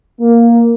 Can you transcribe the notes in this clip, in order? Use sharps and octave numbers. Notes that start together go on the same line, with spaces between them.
A#3